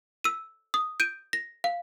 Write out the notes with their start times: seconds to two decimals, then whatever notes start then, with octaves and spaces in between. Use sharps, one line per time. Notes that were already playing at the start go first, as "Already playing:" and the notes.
0.24 E6 D#7
0.74 D#6
1.00 G6 D7 D#7
1.33 A#6
1.64 F5